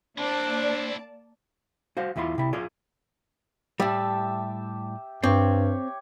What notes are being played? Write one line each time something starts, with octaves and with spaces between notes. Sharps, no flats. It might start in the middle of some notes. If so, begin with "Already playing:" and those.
A#3 C4 D4 E4 C5 D5 A5
F#4 C5 F5
E2 E3 E4 F4 C6
C3 E4
F4 G#4 D5
A2 G3 G4 E5 A5
G2 C4 G4 C#5